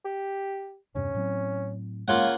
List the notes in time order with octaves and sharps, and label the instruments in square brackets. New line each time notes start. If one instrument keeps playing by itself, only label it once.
[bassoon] G4
[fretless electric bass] E2 G2 C3 [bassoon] C#4
[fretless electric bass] A2 F#3 C4
[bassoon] C#3 [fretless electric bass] G#3 [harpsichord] A#3 F4 F#5